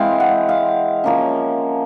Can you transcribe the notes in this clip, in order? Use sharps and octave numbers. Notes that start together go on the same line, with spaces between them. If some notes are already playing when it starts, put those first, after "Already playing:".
Already playing: E3 G#3 C4 F5
F#5
F5
F3 A#3 C#4